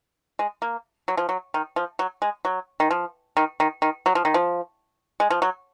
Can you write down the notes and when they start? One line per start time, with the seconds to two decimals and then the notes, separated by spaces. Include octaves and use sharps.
0.39 G#3
0.62 A#3
1.08 F#3
1.17 F3
1.29 F#3
1.54 D#3
1.76 F3
1.99 F#3
2.22 G#3
2.45 F#3
2.80 D#3
2.90 F3
3.37 D#3
3.60 D#3
3.82 D#3
4.06 F#3
4.15 F3
4.25 D#3
4.34 F3
5.20 G#3
5.30 F3
5.42 F#3